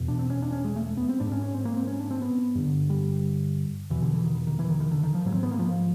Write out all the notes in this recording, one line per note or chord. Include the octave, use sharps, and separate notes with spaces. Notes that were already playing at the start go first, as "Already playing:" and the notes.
Already playing: E2 B2
D4
C4
C#4
D4
C#4
G#3
A3
B3
C4
G#2 D4
C#4
C#4
C4
A#3
C4
C#4
D4
C4
B3
G2 D3
G3
E2 B2 E3
D3
E3
D#3
D#3
E3
D#3
D#3
D3
D#3
F3
G#2 F#3
C4
B3
A#3
F3